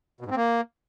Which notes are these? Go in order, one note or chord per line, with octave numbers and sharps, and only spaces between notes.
B2
G#2
C4
A#3